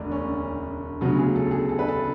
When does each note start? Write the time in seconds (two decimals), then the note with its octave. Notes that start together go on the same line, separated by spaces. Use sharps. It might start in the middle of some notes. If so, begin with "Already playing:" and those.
Already playing: E1 D2 D3 D4
0.11 C#4
1.01 D2 C#3 F#3 B3
1.19 G#4
1.36 A4
1.51 G#4
1.69 A4
1.79 B4
1.88 A4